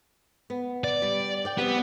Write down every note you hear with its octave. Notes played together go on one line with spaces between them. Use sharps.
B3
D5
G3
D5 G5
G3 B3 C4 G4